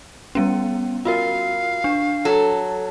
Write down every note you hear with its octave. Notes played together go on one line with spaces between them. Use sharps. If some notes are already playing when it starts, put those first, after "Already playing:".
G3 B3 C#4
F4 F#4 A#4 F5
D4
F#3 A4